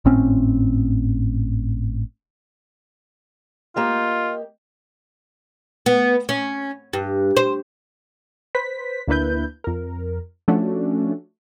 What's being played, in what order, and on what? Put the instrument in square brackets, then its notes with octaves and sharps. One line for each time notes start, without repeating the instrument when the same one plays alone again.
[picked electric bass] G#1 A2 C4 C#4
[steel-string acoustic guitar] A#3 G4 D#5 [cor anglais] F4
[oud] B3
C#4
G2
C5
[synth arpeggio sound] B4 C5 B6
D2 A#3 D4 E4 B4 G6
F2 A#4
F3 A3 C#4 D4 F#4